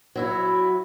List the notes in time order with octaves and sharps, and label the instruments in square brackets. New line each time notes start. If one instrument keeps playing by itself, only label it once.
[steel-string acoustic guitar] F#3 E4 F#4